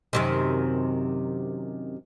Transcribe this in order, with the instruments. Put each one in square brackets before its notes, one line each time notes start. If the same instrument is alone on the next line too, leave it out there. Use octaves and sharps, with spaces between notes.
[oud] F#2 C3 D#3